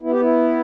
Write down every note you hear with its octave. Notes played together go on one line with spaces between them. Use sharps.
B3 E4
G4
E4